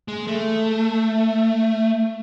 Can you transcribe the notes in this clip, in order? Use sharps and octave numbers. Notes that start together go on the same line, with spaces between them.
G#3
A3